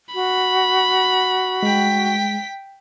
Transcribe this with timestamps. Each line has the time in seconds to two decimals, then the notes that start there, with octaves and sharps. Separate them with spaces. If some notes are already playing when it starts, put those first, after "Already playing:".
0.14 F#4 B5
1.63 G#3 G5 B6